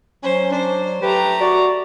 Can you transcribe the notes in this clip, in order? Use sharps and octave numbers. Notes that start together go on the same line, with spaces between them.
F#3 C#4 C5
D4 C5
A3 G4 B4 A#5
F#4 D5